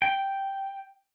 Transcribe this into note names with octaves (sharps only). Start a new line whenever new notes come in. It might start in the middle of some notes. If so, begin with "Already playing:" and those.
G5